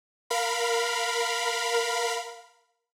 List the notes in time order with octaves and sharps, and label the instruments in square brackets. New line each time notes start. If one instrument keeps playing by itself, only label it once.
[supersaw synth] A#4 F5 B5